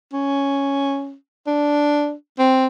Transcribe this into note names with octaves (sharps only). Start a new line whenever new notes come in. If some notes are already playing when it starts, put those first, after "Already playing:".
C#4
D4
C4